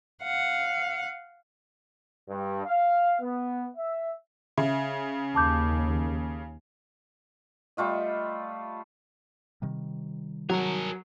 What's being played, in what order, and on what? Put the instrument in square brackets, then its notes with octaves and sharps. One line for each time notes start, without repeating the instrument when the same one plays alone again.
[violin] F5 [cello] F#5
[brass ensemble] G2
F5
B3
E5
[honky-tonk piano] C#3 [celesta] E5
[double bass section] D#2 [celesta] A5 D6 G6
[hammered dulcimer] G3 A3 F4 D#5
[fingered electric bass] C3 D#3 G3
[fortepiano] F#3 F#5 [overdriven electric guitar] G#4 A#4